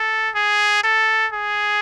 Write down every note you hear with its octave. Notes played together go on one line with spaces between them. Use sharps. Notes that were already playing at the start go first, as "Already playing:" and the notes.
Already playing: A4
G#4
A4
G#4